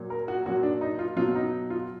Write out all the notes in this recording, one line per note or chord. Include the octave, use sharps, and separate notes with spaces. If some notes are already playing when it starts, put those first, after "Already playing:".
Already playing: A#2 F#3
A#4
F#4
A#2 F#3 F#4
D4
D#4
F4
B2 F#3 F4
D#4
F4